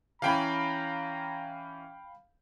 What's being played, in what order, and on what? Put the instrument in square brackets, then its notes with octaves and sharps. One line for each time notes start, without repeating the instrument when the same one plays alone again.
[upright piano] E3 C#4 [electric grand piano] F5 G5 B5 [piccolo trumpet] A#5